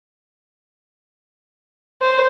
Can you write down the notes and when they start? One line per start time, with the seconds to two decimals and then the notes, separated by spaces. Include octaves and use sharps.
2.01 C5